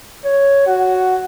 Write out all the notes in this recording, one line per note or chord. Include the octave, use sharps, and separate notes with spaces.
C#5
F#4